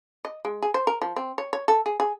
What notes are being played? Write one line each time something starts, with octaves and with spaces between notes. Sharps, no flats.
D#5
G#3
G#4
C5
A#4
F3
C4
C#5
C#5
A4
G#4
G#4